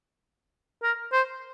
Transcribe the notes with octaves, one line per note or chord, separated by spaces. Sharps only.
A#4
C5